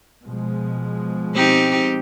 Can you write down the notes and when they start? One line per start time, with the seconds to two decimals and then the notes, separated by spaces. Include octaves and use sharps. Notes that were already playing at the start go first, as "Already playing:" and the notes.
0.22 B2 F3 G#3
1.35 C4 D#4 G4